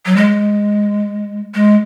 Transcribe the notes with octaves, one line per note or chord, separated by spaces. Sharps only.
F#3
G#3
G#3